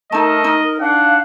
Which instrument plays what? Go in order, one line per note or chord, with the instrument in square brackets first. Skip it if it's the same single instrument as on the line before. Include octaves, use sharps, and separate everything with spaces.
[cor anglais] A3 [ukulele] D#4 A5 [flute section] A#4 [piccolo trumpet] D#5
[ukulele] D#4
[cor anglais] D4 [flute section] F5 [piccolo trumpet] F#5